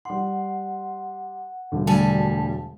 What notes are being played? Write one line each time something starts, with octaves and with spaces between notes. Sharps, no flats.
G3 F#5 C6
E1 G2 D3
D2 G3 G#5 A5